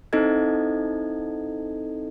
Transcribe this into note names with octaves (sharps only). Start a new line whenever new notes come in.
C4 D#4 E4 A4 D#5 G#6